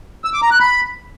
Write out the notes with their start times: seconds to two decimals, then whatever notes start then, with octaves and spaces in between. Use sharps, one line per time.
0.24 E6
0.33 D6
0.42 A#5
0.51 F#6
0.60 B5